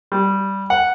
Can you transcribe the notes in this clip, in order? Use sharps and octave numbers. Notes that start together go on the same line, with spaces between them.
G3
F#5